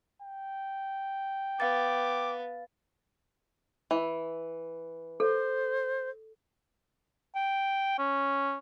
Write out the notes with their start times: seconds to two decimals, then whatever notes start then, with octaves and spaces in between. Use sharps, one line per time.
0.22 G5
1.60 B3 F5 D6 A6
3.91 E3
5.20 A4 C5
7.35 G5
7.98 C#4